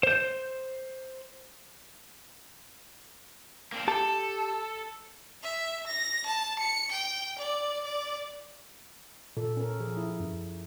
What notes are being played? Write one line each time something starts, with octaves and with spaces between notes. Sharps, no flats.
C5 G6
A#3 C4 D4
G4 A4 A5
E5
A#6
A5
C#7
G5
D5
D5
A#2 A4
C#4 A#4
F3 G#4
E4
F#2